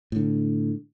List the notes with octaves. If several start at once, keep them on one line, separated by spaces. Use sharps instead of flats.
A2 D3